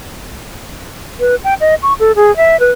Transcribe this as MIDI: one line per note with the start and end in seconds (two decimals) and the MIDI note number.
1.20 1.35 71
1.44 1.54 79
1.61 1.75 75
1.82 1.93 85
2.00 2.12 69
2.16 2.35 68
2.37 2.59 76
2.60 2.71 71